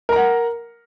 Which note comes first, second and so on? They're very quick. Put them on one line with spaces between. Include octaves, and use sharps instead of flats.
A#4 A#5 F#5